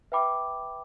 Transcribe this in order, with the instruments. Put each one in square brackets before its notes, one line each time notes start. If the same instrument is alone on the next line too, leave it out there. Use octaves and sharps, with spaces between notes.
[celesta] B4 E5 G5 B5 D6